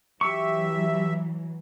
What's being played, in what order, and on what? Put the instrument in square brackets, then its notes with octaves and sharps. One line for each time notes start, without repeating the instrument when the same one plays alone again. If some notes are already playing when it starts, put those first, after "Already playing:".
[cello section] E3 F#3 [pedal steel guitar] G4 C#6 [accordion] E5